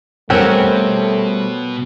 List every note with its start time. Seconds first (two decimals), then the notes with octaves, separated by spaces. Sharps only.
0.30 B2 G3 A3 C4 C#4 F#4 A#4